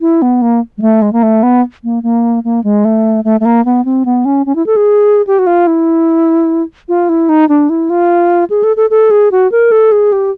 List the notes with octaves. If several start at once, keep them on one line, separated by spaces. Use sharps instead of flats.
E4
B3
A#3
G#3
A3
G#3
A#3
A3
B3
A#3
A#3
A#3
G#3
A3
A3
A3
A#3
B3
C4
B3
C#4
C#4
E4
A4
G#4
G4
F#4
F4
E4
F4
E4
D#4
D4
E4
F4
G#4
A4
A4
A4
G#4
F#4
A#4
A4
G#4
G4